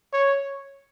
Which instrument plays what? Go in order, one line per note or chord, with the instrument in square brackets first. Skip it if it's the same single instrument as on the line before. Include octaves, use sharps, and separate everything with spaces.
[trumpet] C#5